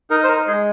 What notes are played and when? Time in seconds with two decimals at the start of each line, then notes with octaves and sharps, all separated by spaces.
0.10 D#4 A#4
0.24 C5
0.29 A#4
0.47 G#3 G#4